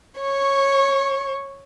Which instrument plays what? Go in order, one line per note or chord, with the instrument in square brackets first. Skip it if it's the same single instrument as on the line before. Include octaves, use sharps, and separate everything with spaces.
[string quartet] C#5 C#6